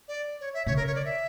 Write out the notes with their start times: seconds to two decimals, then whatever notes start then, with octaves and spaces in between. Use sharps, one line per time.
0.08 D5
0.41 C#5
0.54 E5
0.67 C#3 C#5
0.76 A#4
0.87 C#5
0.95 D5
1.05 E5